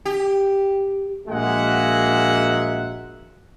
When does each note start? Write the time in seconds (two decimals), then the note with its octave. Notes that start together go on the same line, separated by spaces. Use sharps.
0.05 G4
1.28 A#1 G#3 A#3 F#4 E5 F#5